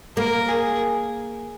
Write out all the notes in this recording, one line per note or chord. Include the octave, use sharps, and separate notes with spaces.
A#3 A#4
G#4